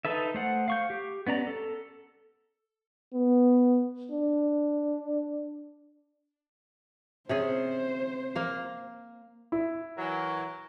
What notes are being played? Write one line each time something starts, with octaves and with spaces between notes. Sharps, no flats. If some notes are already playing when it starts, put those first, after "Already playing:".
D#4 A4 B4 E5
A3 C5 F#5
F5 C#6 G6
G4
B3 C#4 D5 A#5
A4
B3
D4
C3 C#4 G#4 C5
A#3 F5
E4
E3 F#3 A#4